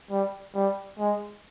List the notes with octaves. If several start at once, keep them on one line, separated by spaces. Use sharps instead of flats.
G3
G3
G#3